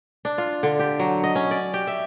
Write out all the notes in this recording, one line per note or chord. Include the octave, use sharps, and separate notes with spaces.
D4
F4
D3
G4
F#3
D#5
C#4
D5
G4
E5